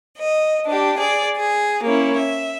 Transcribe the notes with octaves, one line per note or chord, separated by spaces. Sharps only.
D#5
D4 G4
G#4 D5
G#4
A#3 C#4 E4
E5